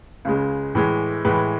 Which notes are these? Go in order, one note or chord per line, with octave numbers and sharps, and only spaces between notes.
C#2 C#3 G#3
A2 E3 G#3
A2 E3 G#3 B4